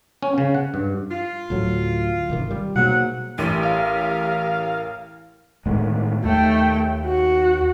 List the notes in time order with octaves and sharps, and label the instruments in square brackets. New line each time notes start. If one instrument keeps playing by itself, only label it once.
[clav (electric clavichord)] C#4
C#3
F#5
G2
[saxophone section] F4
[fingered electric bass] D2 A2 F#3
G#1 C3 D#3
G3
[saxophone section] G#2 F#3 F#5 [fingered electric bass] B2 A#3
[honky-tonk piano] A1 [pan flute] G4 [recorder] A#4
[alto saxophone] F5
[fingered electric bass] A2 D#3 G#3
[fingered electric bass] D#2 [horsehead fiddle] A3 G5
[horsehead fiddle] F#4